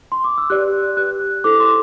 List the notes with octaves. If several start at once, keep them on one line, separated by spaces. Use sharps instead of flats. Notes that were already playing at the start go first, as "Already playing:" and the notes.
C6
D6
E6
G4 B4 D5 F#6
G4 B4 D5 F#6
E4 A4 C5 D6
C6